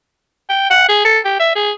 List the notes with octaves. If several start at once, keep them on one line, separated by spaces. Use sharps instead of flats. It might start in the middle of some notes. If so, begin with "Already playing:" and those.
G5
F#5
G#4
A4
G4
E5
G#4